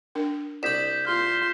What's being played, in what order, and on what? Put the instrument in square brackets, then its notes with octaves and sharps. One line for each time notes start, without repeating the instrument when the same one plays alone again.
[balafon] D4 A#4 G5
[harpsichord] C2 B5 [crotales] G6 B6 E7
[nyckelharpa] F4 C6 [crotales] F6 G6